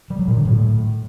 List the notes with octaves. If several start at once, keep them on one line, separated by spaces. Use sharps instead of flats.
G3
F#3
A#2
D3
A2